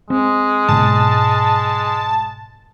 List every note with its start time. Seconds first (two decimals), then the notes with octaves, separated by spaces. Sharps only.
0.10 G#3 C4
0.69 G#2 B2 A5